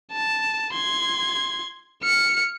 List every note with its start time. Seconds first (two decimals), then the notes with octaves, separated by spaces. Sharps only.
0.12 A5
0.73 C6 G#6
2.03 F6 C#7